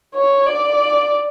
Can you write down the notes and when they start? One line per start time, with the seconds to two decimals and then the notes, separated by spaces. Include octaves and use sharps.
0.15 C#5
0.47 D5